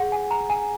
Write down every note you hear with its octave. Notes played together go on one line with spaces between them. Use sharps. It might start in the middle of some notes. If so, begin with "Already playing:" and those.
Already playing: G#4 F#5
G#5
A#5
G#5